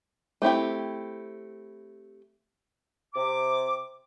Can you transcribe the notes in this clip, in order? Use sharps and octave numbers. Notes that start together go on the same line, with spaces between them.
A3 C4 E4 G4
C3 D6